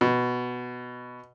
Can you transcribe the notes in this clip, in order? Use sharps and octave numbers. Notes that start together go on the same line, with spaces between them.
B2